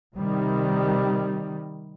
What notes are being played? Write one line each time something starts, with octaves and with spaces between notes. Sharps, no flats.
C3 D#3 G3